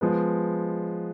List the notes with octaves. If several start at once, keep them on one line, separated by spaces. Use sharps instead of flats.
F3 G#3 B3